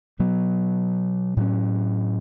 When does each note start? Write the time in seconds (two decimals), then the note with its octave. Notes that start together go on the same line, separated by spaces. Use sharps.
0.19 B2 F#3 B3
1.37 A2 F#3 C#4